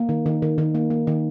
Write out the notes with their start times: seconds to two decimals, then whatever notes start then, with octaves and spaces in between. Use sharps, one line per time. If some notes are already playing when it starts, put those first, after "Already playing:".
Already playing: A#3
0.09 D#3
0.26 D#3
0.42 D#3
0.58 D#3
0.75 A#3
0.90 A#3
1.07 D#3